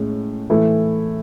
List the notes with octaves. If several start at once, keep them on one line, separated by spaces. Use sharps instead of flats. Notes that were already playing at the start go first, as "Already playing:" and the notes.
Already playing: A2 G#3 C#4
A2 E3 A3 E4